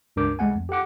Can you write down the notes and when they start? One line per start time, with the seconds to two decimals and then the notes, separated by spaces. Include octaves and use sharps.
0.16 C#2 G2 D4 A#4 D6 G6
0.39 C2 G#3 A3 F#5 G#5
0.54 F2
0.69 G4 A4 F#5 D6